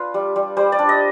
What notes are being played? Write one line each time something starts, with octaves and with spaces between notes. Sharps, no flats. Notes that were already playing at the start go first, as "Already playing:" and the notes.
Already playing: D4 F4 B4
G3
G3
G3 C5
D5
D4
D#5